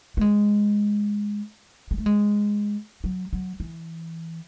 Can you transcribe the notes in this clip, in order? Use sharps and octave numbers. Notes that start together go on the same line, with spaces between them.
A3
G#3
G#3
A3
G#3
F#3
F#3
E3